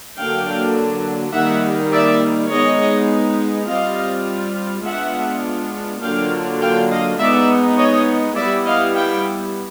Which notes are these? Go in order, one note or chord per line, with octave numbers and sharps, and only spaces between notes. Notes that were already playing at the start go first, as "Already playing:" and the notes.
D3 F#3 A#3 D4 F5 G5
D#3 G3 A#3 D#4 E5 F#5
D5 E5
G#3 B3 D#4 C#5 D#5
G3 C4 F4 D#5 F5
G#3 B3 D4 F4 E5 F#5
D3 F#3 A#3 D4 F4 F5 G5
F5 G5
D#5 F5
G#3 B3 D#4 D5 E5
C#5 D#5
G3 B3 E4 D5 E5
D#5 F5
F5 G5